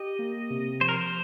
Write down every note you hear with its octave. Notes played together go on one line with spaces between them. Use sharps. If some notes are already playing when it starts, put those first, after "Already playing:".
Already playing: G4 D#5
A#3
C3
F3 C5
A#4
C5